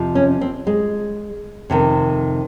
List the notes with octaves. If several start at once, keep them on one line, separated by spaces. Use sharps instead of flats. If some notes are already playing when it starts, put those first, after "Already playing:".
Already playing: F2 C3 F3
C#4
C4
G#3
F2 C3 D#3